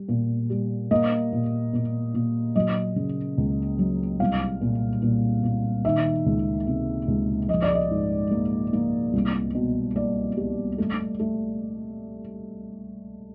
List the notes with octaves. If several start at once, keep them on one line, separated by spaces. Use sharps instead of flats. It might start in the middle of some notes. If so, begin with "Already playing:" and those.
Already playing: G3
A#2
G3
A#3 D#5
A#2
A#2
A#2
F#3 D#5
C#3
C#2
F#3
C2 F5
A#2
A#2
A#2
D#3 E5
C#2
C3
C#2
F3 D#5
D5
D#5
G#2
A#3
A#3
C2
B2
A#3 D5
G3
A3
A3